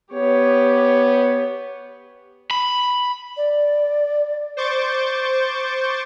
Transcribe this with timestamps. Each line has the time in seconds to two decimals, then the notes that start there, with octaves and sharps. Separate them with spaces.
0.13 B3 G4 C#5
2.51 B5
3.37 D5
4.57 C5 C#6 D6 G6 A6